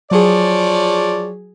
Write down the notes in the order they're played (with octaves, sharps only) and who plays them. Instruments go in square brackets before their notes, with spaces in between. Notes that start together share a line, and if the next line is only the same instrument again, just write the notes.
[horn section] F3 C#5 D5 [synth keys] F#3 G#4